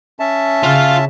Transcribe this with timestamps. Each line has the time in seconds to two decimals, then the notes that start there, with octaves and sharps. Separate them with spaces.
0.19 C#4 E5 A5
0.63 C#3 F4 F5